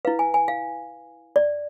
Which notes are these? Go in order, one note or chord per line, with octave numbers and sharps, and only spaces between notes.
E4 B4 F5
G#5
G#5
F5
D5